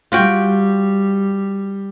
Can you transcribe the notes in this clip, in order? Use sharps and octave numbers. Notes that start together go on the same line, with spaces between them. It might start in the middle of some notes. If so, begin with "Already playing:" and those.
G3 F4 F#4 G5